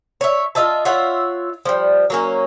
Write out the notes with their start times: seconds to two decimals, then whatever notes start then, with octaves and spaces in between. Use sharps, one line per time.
0.21 C#5 E5
0.55 F4 D#5 E5 A5
0.85 F4 C#5 E5 F#5
1.65 F3 G3
2.10 F#3 A#3 C#4